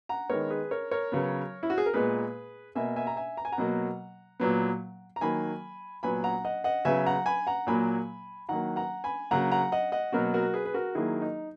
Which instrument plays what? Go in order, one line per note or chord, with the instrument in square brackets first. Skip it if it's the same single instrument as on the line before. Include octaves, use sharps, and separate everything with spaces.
[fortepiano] F#5 A#5
D#3 G#3 B3 A#4 C#5
G#4 B4
A#4 C#5
A#4 C#5
C#3 F#3 B3
E4
F#4
G#4
A#4
A#2 G#3 B3 G#4 B4
B2 A#3 E5 G#5
E5 G#5
A#5
E5 G#5
A#5
G#5
F#5 A#5
B2 F#3 A#3
A#2 F#3 B3
A#5
D#3 F#3 A#3 G#5 B5
A#2 F#3 B3 G#5 B5
F#5 A#5
D#5 F#5
D#5 F#5
C#3 F#3 B3 E5 G#5
F#5 A#5
G#5 B5
F#5 A#5
A#2 F#3 A#3 G#5 B5
D#3 F#3 A#3 F#5 A#5
F#5 A#5
G#5 B5
C#3 F#3 A#3 F#5 A#5
F#5 A#5
D#5 F#5
D#5 F#5
B2 F#3 A#3 F#4 A#4
F#4 A#4
G#4 B4
B4
F#4 A#4
D#3 F#3 A#3 E4 G#4
D#4